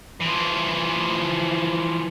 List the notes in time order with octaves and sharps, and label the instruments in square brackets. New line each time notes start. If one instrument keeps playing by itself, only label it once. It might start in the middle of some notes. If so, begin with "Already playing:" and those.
[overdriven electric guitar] E3 F3